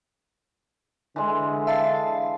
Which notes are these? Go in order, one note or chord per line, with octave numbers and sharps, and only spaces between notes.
D3 E3 G#3
E5 F5 A5